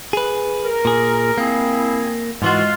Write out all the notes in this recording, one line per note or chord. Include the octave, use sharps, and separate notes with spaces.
G#4 B4
A#4
A#2 G#4
A#3 C4 E4 G#4
G#2 E3 G#3 F4 F#4